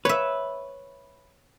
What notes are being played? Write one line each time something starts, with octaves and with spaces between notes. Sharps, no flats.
B4 C#5 E5